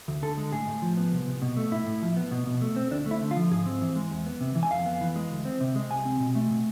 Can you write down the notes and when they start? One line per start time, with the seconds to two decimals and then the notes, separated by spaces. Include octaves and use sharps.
0.08 D2
0.22 D3 A4
0.37 G#3
0.52 A2 G#4
0.67 A2
0.82 F3
0.97 B3
1.12 C2
1.27 C2
1.42 B2
1.57 A3
1.72 A2 E4
1.87 A2
2.02 F3
2.17 B3
2.31 B2
2.47 B2
2.61 A3
2.76 C4
2.91 D2 D4
3.06 A3
3.11 E4
3.22 D3
3.31 F4
3.36 F3
3.51 G#2 G#4
3.66 C4
3.81 E3
3.96 G#3
4.11 E2
4.26 B3
4.41 C3
4.55 E3
4.63 G#5
4.71 F2 F5
4.86 B3
5.01 E3
5.16 G#3
5.31 D2
5.45 C4
5.60 C3
5.76 G#3
5.90 C2 G#5
6.05 C4
6.20 B2
6.35 A3
6.50 B2